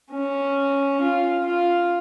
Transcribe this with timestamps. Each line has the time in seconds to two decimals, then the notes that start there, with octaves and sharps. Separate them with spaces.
0.11 C#4
1.02 F4
1.46 F4